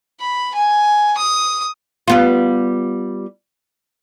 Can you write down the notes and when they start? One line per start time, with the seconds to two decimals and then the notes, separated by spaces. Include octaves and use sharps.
0.20 B5
0.54 G#5
1.17 D#6
2.08 G3 B3 F4